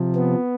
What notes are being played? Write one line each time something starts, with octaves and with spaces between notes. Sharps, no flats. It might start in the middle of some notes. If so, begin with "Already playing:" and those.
Already playing: C3 F3
B3